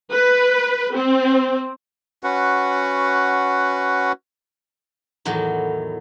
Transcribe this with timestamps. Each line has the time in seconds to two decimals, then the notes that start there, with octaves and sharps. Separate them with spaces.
0.13 B4
0.97 C4
2.24 C#4 F#4 B4 F#5
5.25 E2 A2 D#3 F#3